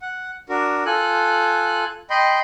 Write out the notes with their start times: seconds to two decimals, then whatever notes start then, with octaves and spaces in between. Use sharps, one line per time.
0.02 F#5
0.49 D4 F#4 A#4
0.86 F4 A4 G#5 F#6
2.10 D#5 G5 B5 C6